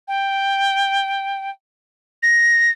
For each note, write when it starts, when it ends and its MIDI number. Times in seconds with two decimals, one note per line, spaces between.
0.08 1.50 79
2.23 2.71 94